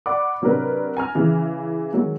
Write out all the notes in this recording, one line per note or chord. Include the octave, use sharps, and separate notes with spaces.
D5 F#5 B5 D6
C3 F#3 D4 A#4 B4
G#5 A#5 F6
C#3 E3
D#3 F#3 G#3